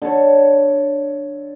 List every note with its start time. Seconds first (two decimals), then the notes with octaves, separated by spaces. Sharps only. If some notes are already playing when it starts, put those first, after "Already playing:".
0.02 D3 A4 C#5